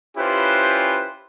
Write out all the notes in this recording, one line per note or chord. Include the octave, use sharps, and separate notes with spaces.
C#4 E4 F4 G4 B4 C5